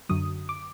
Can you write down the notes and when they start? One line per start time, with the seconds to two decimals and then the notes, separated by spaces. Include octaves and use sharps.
0.09 F#2 D3 F#3 D#6
0.49 D6